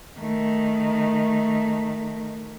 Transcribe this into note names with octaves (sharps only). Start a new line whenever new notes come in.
D#3 A3